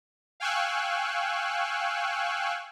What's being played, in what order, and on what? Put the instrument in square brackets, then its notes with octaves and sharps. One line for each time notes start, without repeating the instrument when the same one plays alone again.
[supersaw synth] F5 G5 G#5 C#6 E6 F#6